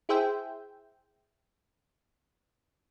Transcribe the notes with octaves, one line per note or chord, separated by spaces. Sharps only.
E4 G#4 C5 E5 G5